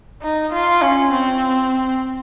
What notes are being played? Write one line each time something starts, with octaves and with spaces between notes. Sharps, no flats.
D#4
F4
C#4
C4